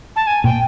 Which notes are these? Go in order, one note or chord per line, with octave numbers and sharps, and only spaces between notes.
A5
G#5
A#2 G5